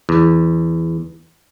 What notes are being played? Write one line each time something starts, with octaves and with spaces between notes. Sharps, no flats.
E2